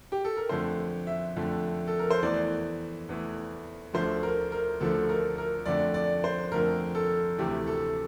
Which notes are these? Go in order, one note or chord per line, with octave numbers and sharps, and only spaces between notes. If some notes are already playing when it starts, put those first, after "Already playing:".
G4
A4
A#4
F2 D3 A3 C5
E5
F2 D3 A3
A4
A#4
C5
E2 E3 A3 D5
E2 E3 A3
D2 D3 F3 A3 C5
A#4
A#4
D2 D3 F3 A3 A4
A#4
A#4
F2 D3 A3 D5
D5
C5
F2 D3 A3 A#4
A4
D2 C3 E3 A3 G4
A4